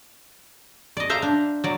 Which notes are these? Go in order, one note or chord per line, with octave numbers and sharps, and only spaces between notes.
D5 D#5
C5 E5 F5 A#5
D4
F#3 D5